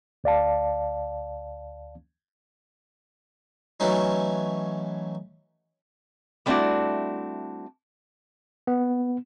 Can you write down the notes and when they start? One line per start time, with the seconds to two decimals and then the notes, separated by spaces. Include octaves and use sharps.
0.24 D2 D5 F5 A5
3.80 E3 F#3 A3 C#4 D#4
6.46 G3 A3 C4 D4 E4 F#4
8.67 B3